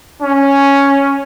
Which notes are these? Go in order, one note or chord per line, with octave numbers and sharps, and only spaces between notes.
C#4